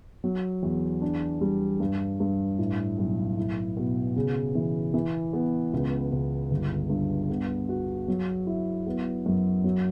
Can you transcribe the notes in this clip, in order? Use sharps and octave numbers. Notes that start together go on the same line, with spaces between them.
F#3
E2
D4
G3
G2
G2
A2
B1
E4
B2
C#3
E3
E3
B3
C#2
C#2
G1
G2
B3
F#4
F#3
E4
B3
F#2
F#3